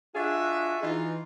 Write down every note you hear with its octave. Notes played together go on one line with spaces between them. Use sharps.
D4 F4 F#4 G#4 D#5 E5
E3 D#4 F4